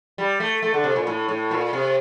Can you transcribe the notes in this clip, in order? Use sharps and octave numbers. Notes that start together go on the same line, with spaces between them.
G3
A3
A3
D3
C3
A#2
A2
A2
A#2
C3